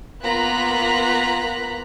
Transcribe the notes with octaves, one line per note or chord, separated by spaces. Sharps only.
A#3 B3 F4 A#5 F#6 B6